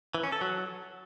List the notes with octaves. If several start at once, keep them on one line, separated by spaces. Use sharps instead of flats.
E3
C#4
A4
F#3